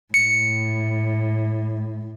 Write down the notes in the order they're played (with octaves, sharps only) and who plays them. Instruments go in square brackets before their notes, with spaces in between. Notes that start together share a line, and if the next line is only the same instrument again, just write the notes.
[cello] A2 [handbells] C#7